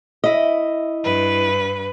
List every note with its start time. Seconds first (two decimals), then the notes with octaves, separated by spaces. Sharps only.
0.24 E4 D#5
1.02 G2 B4